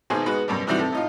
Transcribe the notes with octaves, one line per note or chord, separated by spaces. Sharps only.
G#1 G#2 B2 G#4 C5
G#3 B3 D#4 F#4 B4
F#2 B2 G3
G#2 C3 E3 G3 E4 F#4
C3 A4
A2 D#4 F4